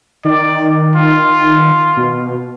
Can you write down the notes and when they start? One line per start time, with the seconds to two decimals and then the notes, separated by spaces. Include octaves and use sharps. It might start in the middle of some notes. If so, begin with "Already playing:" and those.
0.25 D#3 D5
0.96 F4
1.97 B2